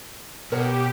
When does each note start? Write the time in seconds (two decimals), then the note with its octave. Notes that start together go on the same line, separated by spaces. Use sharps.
0.52 B2 G4 A#4 C#5 F#5